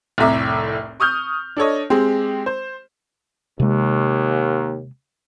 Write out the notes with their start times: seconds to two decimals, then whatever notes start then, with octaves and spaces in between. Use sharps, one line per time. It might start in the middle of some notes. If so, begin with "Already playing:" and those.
0.18 F1 C2 A2 E5 A#5 D6
1.00 C#6 D#6 F6 G6
1.56 D4 A4 C#5 D#5
1.90 G#3 C4 G4 G#4
2.46 C5
3.60 D#2 C3 G#3